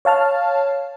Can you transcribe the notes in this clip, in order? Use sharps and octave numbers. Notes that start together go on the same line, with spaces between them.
C#5 F5 A5 F6